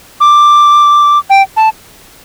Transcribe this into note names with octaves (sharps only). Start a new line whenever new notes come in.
D6
G5
A5